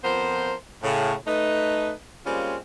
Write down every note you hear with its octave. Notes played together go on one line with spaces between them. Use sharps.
F2 F3 B3 A#4 C5
A2 C#3
A3 D#4 B4
G3 G#3 A#3 C4 C#4 F4